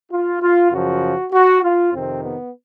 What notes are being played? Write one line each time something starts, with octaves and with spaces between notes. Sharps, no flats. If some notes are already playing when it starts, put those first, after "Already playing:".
F4
F4
F#2 C#3 F3 F#4
F#4
F4
F2 C3 D#3 C4
B3